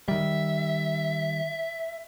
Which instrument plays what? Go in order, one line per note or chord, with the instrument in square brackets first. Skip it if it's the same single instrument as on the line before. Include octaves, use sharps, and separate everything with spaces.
[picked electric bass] D#3 G3 [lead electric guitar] E5